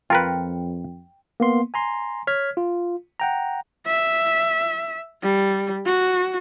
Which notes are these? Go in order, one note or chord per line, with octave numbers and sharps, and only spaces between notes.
F2 F4 A#4 B4 G5
A#3 B3 C6
G#5 A#5 C6
C#5 F6 G#6 B6
F4
F#5 G5 A#5
E5
G3
F#4